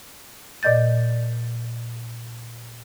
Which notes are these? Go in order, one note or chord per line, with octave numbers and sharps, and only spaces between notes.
A#2 D5 D#5 G6 A6